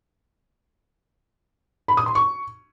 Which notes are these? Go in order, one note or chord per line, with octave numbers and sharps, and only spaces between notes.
B5
D#6
C6
C#6